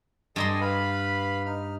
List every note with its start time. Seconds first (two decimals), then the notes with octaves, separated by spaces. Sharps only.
0.36 G2 A4 D#5 G#5 A#5 C6
0.61 B4 F5 B5
1.46 D#4 F6